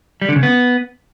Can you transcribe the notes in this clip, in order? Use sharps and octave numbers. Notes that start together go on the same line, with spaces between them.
G3
D3
C#3
B3